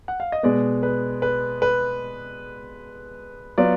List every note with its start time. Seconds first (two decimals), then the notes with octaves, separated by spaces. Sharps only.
0.08 F#5
0.20 F5
0.32 D#5
0.43 B2 G#3 B3 D5
0.83 B4
1.22 B4
1.62 B4
3.58 F#3 B3 F4 D5